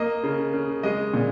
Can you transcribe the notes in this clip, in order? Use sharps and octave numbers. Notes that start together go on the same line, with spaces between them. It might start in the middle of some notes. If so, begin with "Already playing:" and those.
Already playing: A#3 D#5
C#3
C#3
G#3 D#5
A#2